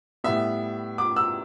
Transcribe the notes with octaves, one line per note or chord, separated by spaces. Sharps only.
A2 G3 B3 E5
D6
E6